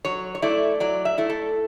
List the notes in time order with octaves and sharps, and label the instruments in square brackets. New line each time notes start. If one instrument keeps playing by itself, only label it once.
[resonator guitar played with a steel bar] F#3 C#5
C#5
A3 E4 D5
F#3 D5
E5
A3 E4
A4